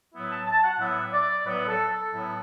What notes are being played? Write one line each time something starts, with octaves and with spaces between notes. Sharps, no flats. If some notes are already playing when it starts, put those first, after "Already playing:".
A2 F#3 B3 E4
A5
A5
F#5
A2 F#3 B3 E4 E5
D5
A2 F#3 B3 E4 B4
A4
A4
A2 F#3 B3 E4